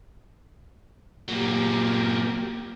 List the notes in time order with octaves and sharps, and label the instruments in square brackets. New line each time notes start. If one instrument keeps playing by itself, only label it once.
[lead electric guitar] A#2 F#3 [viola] A#3 G4